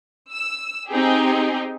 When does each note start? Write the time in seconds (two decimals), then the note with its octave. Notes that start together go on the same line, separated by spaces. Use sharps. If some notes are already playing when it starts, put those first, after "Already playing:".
0.32 E6
0.89 C4 D#4 G4 G#4